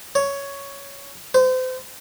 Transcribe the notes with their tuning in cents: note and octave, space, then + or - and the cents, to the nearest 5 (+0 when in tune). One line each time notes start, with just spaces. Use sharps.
C#5 +5
C5 -35